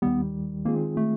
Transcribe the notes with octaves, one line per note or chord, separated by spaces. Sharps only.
D#2 D#3 G3 B3
D#3 G#3 A#3 C4 F4 G#4
A3